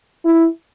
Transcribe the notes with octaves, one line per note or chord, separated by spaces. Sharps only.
E4